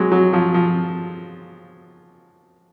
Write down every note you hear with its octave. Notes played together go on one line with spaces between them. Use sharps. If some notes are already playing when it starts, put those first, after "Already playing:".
Already playing: F#3 G#3
F#3
F3
F3